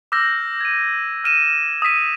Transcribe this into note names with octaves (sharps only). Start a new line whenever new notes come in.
D6 E6 F6 G6 A#6
G#6 D#7
F6 D#7 E7
D#6 E6 B6 D#7